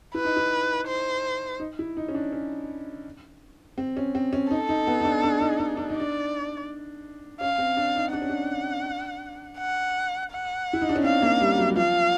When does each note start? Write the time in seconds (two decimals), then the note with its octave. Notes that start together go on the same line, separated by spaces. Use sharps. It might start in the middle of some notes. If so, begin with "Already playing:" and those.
0.14 E4 B4
0.25 D#4
0.36 E4
0.88 C5
1.60 D#4
1.79 E4
1.97 D#4
2.09 C#4
2.15 D4
2.32 C#4
3.78 C4
3.97 C#4
4.15 C4
4.33 C#4
4.51 D#4 A4
4.69 D#4
4.87 B3
5.00 D#4
5.05 D4
5.23 D4
5.41 D#4
5.59 D#4
5.77 D4
5.89 D#4
5.96 D4 D5
7.40 C#4 F5
7.58 C4
7.77 D4
7.96 D#4
8.13 D4 F#5
8.22 C#4
8.29 D4
9.58 F#5
10.31 F#5
10.73 E4
10.81 D#4
10.89 D4
10.96 C#4
11.03 C4 F5
11.22 A#3
11.41 G3
11.59 F#3
11.70 F#3
11.76 F3 F5